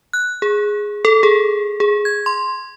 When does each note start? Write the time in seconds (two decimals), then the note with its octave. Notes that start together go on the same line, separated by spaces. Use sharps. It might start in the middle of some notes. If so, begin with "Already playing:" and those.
0.13 F#6
0.42 G#4
1.05 A4
1.23 G#4
1.80 G#4
2.05 G#6
2.26 C6